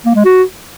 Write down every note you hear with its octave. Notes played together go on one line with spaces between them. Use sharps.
A#3
G#3
F#4